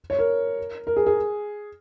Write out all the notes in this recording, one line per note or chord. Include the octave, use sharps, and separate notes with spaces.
C#5
A#4
A#4
G#4
G#4